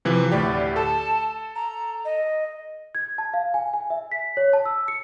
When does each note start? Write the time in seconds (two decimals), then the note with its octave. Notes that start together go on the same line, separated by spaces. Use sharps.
0.05 C3 E3 F3
0.31 D2 A2 G4 D5
0.76 A4 A5
1.56 A#5
2.05 D#5
2.95 G#6
3.18 A5
3.34 F5
3.54 G#5
3.74 G#5
3.90 E5
4.12 B6
4.37 C#5
4.53 A5
4.65 E6
4.88 C#7